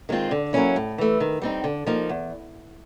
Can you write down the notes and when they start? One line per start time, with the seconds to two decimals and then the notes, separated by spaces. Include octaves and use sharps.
0.09 D#3 G#3 C4 F4
0.31 D3
0.53 F#3 A#3 C#4 E4
0.76 A2
0.98 E3 A3
1.20 D#3
1.42 G3 C4 D#4
1.64 D3
1.86 F3 A#3 D#4
2.09 E2